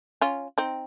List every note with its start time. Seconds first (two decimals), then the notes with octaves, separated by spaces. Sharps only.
0.21 C#4 F4
0.58 C4 D#4